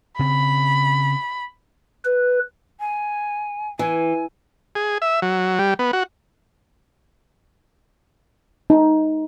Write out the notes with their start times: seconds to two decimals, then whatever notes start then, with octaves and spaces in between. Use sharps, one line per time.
0.19 C#3 C4 B5
2.05 B4
2.80 G#5
3.79 E3 G#5
4.75 G#4
5.02 E5
5.22 F#3
5.59 G3
5.79 B3
5.93 F#4
8.70 D#4